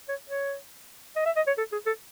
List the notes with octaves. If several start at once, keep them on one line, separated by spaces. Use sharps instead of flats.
C#5
C#5
D#5
E5
D#5
C#5
A4
G#4
A4